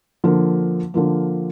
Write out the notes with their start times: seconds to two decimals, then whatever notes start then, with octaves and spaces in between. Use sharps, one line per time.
0.24 D3 F3 A#3
0.94 D3 F3 A#3